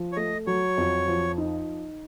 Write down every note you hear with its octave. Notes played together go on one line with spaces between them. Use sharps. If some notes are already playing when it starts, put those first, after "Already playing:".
Already playing: F3
C#5
A3 D#5
F#3 C#5
F2
F3
D#4